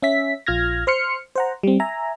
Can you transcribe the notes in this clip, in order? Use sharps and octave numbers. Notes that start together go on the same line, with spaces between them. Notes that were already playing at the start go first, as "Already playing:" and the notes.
C#4 E5 B6
A#1 F4 F6 G#6 A#6
C5 C6 F6 C#7
C5 F#5 A#5
G3 C4
E5 G#5 A#5